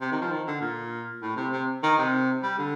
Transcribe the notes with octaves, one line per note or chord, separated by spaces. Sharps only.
C3
D#3
F3
D#3
D3
A#2
A2
C3
C3
D#3
C3
G3
D3